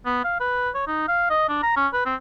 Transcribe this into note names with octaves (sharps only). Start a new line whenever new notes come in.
B3
F5
B4
C#5
D#4
F5
D#5
D4
A#5
C#4
B4
C4